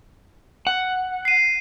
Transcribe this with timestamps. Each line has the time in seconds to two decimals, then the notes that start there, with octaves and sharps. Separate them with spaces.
0.67 F#5
1.25 C7 D#7